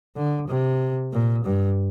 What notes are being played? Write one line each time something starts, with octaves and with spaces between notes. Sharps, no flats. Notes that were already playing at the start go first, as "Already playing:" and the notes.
D3
C3
A#2
G2